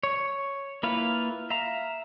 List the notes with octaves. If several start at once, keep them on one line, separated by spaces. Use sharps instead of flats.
C#5
A#3 E4 F4 B4 F5
E5 F5 A#5